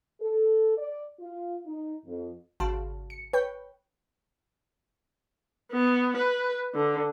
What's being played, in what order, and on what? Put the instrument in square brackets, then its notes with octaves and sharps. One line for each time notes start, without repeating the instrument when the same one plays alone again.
[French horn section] A4
D5
F4
D#4
F2
[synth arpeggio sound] G#1 C#3 F#4 F5 A5 C6
C#7
B4 C#5 G5 C#6 G6
[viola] B3
B4
D3